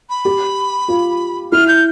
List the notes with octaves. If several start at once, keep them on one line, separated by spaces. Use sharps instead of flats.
B5
G4
F4
E4 F6
G6